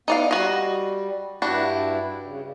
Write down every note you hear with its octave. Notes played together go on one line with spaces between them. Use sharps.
B3 D#4 D5 F5
G3 F#4 D#5
G2 G3 D4 E4 F#4
C#3